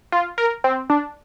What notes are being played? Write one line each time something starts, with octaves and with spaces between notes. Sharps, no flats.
F4
A#4
C4
D4